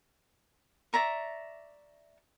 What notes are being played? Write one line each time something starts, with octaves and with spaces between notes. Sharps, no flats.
D5 E5 A#5 C#6